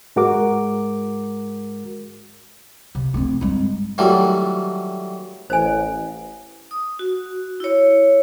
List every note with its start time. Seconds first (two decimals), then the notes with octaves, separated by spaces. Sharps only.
0.16 G#2 G#3 F#4 A#4 D6
2.95 C3
3.14 A3 C4
3.41 G2 G#3
3.98 D#3 E3 F#3 G3 A3
5.50 A1 C5 G#5
6.71 D#6
6.99 F#4
7.60 E4 C#5